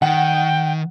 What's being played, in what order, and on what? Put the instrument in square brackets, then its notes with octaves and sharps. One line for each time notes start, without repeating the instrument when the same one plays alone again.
[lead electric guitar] D#3 [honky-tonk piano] F#5 [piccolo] G5